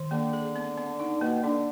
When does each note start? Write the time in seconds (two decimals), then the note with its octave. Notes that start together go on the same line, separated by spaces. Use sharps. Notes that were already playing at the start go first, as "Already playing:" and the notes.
Already playing: D#3
0.11 D3 A#3
0.33 G#4
0.56 B3
0.77 B3
1.00 D#4
1.21 B2 A#3
1.43 D3 D4